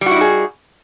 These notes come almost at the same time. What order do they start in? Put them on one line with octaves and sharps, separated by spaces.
G3 F#4 E4 D#4 G#4